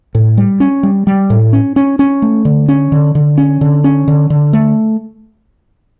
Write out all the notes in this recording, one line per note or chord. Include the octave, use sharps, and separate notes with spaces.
A2
G3
C#4
G3
G3
A2
C#4
C#4
C#4
A3
D3
C#4
D3
D3
C#4
D3
C#4
D3
D3
A3